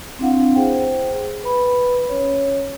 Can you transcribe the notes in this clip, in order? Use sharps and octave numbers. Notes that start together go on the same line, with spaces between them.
C4 D4 E4 F5 F#5
G#4 C5 G5
B4 B5
C#4 C#5